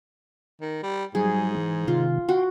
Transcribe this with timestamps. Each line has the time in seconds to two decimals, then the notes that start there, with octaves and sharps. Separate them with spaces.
0.61 D#3
0.83 G3
1.15 G#2 F#3 G3 G#4
1.57 E3
1.88 C3 D#3 F4
2.29 F#4 F#5 G5 C6